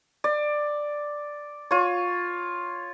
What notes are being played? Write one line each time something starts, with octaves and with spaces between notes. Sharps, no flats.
D5
F4 C#5